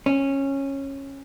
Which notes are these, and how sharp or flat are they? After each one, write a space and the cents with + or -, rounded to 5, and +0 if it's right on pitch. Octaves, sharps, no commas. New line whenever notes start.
C#4 -15